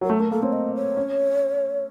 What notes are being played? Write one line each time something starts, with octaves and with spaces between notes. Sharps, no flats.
F#3 A#4
A3 A4
A3 A#4
A#3 A4
C4 C#5
D#5
C#5
C#4